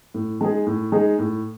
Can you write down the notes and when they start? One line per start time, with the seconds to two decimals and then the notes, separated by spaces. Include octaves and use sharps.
0.14 A2
0.41 G#3 D#4 G#4
0.67 A2
0.92 G#3 D#4 G#4
1.19 A2